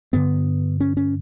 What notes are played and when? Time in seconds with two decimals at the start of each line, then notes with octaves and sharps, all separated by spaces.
0.13 G2 D3 B3
0.80 C#4
0.97 C#4